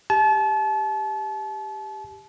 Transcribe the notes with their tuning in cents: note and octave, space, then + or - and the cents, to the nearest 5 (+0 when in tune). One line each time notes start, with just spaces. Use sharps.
G4 +10 A5 -35